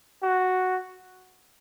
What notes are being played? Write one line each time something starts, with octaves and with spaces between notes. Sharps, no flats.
F#4